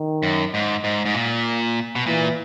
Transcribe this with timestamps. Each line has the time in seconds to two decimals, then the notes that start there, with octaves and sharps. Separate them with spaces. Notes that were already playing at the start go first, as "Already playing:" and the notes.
Already playing: D#3
0.23 F#2
0.54 G#2
0.84 G#2
1.06 G#2
1.15 A#2
1.95 B2
2.06 A#2 E3